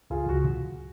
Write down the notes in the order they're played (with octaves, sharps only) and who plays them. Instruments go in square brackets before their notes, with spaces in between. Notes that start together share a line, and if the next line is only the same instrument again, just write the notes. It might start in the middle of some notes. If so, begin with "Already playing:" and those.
[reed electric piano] C#2 [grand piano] F4 G#4
[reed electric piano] C#2 [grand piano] F#4